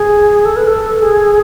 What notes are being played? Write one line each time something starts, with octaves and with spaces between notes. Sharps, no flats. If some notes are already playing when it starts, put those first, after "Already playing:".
Already playing: G#4
A4
B4
A4
G#4